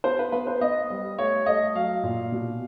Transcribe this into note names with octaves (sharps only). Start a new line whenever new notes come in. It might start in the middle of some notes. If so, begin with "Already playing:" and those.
B3 C5
B4
B3 B4
C5
B3 D#5
G3
A3 C#5
A3 D#5
F#3 F5
A#2
B2